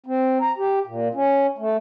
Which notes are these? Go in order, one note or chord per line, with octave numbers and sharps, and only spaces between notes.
C4
A#5
G4
A#2
C#4
A3